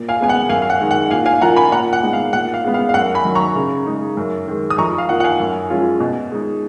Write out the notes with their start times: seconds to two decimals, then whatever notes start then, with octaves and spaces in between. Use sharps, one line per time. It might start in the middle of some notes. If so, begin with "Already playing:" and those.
Already playing: A#2
0.09 F5 G#5
0.20 G#3 B3 G#5
0.29 F#5
0.49 F#2 F5 G#5
0.62 F5
0.70 F#5
0.80 D#3 G#3 D#4
0.91 F#5
1.10 A#2 F5 G#5
1.25 F5 G#5
1.41 F3 A#3 F4 F#5 A#5
1.56 G#5 B5
1.72 A#2 F#5 A#5
1.93 F#5
2.03 G#3 B3 D#4
2.13 F5
2.33 A#2 F#5
2.54 F5
2.64 G#3 B3
2.74 F5
2.89 F5
2.94 F#2 F#5
3.14 G#5 B5
3.25 D#3 F#3
3.35 A#5 C#6
3.56 C#3
3.86 G#3 D#4
4.17 F#2
4.48 D#3 G#3
4.70 D#6
4.78 F2 A#5 C#6
4.98 F5
5.09 F3 A#3 D#4 F#5
5.20 F#5
5.24 F5 G#5
5.40 F#2
5.70 F3 G#3 C#4 F4
6.00 B2
6.32 G#3 D#4